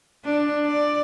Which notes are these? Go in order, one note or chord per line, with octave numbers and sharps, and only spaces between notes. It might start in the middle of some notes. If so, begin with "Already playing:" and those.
D4
D5